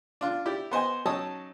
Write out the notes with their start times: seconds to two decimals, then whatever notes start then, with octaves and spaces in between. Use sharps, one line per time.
0.21 D4 F4
0.46 E4 G4 D5
0.71 B3 C5 D#5 G#5
1.05 F#3 C#4 D#4 A5 D#6 E6